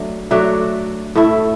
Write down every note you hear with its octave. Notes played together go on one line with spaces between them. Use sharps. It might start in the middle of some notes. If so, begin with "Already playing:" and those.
Already playing: F#3 A3 D4
F#3 A3 D4 F#4
A2 A3 E4